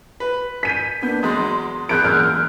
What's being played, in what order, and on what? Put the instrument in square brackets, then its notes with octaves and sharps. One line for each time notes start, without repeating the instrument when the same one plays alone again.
[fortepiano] B4
[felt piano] G#5 G6 [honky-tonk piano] B6 D#7
[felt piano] A#3 B3 G6 [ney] D4
[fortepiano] E2 F#3 G#3 [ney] C6 [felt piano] D#6 A6
[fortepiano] E2 [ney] G#4 [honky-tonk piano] F#6 G6 D7
[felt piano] E1 [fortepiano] F#2 A#2 [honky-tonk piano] F6